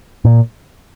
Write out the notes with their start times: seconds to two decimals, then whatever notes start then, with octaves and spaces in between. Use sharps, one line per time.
0.25 A#2